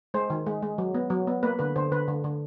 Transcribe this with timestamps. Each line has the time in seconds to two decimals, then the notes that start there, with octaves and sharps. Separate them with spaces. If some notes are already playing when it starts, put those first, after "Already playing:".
0.14 G#3 C5
0.30 D#3
0.46 G#3
0.62 G#3
0.78 F#3
0.94 B3
1.10 F#3
1.27 B3
1.43 A#3 B4
1.59 D3 B4
1.76 D3 C5
1.92 D3 B4
2.08 D3
2.24 D3